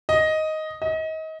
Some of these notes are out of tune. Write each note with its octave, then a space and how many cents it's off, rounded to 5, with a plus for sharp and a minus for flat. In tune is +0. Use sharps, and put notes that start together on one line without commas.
D#5 +5
D#5 +30